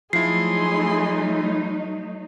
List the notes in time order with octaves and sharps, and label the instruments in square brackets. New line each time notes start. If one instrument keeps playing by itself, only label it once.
[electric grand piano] F3 E4 [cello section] F#3 A3 D#4 [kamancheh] G#4 C6 [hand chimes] C7